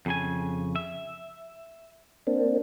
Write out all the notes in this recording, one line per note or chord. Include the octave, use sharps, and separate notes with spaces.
F2 C#3 G#5
E5
A#3 C4 D4